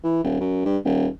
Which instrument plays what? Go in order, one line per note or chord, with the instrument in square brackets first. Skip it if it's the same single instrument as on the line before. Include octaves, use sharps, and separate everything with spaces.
[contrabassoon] E3
D#1
F#2
G2
D#1